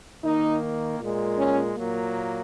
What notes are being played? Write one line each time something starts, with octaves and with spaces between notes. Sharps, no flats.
D#3 A#3 D#4
A#2 G#3
C#4
A#2 F#3 A#3